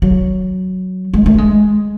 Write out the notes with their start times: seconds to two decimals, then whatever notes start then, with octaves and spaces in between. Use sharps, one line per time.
0.02 F#3
1.14 G#3
1.26 A3
1.38 G#3